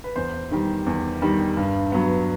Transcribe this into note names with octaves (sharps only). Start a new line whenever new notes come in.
B4
E2 C5
D#3 G3
E2
D#3 G3
G2
F#3 B3